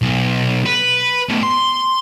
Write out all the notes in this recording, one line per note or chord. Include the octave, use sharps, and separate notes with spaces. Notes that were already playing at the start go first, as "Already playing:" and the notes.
B1
B4
B2 A3
C6